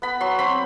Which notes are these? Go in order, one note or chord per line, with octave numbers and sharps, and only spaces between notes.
B3 B5
F#3 C6
C4 B5